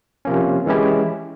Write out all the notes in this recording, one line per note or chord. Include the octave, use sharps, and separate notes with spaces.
C3 F3 A#3 C#4
E3 G#3 C#4 E4 G4